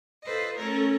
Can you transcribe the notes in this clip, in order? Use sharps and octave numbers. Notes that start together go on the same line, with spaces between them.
F4 A4 B4 C5 D#5
A3 C#4 A4 A#4 C#5